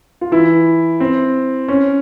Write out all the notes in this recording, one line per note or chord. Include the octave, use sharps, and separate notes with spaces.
F4
E3 E4
C4
C#4